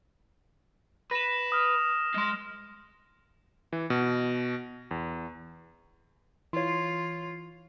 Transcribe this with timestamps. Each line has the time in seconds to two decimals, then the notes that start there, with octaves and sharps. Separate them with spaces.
1.11 B4 A#6 E7
1.52 D#6 F6
2.14 G#3 C6
3.73 E3
3.90 B2
4.91 E2
6.53 E3 F4 C#5 C6